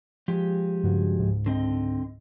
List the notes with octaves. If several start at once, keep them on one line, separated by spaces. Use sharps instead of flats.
F3 G#3 G4
G2 C#3 F#4
C#2 G#2
D3 C4 D#5